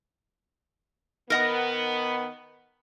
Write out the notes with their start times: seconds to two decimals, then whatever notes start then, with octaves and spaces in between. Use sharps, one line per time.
1.30 D#3 B3 A#4 D#5 F#5